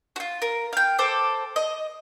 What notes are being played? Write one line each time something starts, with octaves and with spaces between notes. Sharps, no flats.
F4 F#4
A#4
F5 G5
A4 C5 D6
D#5